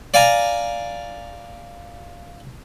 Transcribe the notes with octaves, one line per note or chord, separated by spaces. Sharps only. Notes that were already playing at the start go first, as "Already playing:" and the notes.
D5 F5 G#5 A#5